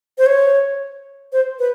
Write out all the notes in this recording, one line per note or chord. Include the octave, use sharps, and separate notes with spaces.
C5
C#5
C5
B4